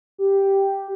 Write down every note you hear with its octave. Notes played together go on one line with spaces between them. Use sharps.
G4